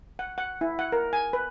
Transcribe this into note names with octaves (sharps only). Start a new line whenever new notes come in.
F#5
F#5
E4
F#5
A#4
G#5
B4